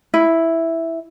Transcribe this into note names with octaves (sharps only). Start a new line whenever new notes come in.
E4